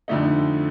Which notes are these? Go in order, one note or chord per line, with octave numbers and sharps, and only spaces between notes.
F2 D3 F3 A3 D#4